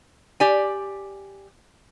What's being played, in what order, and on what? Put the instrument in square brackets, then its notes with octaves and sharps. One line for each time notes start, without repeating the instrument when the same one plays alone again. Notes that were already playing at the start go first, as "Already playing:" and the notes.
[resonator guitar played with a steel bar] G4 D5 G#5